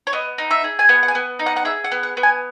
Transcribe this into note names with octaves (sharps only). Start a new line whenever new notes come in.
C#5
B3 D#5
D#4
E5
G#4
G#5
B3 F#5
F#5
G#5
B3
D#4
F#5
F#5
G#4 E5
F#5
B3
F#5
B3
G#5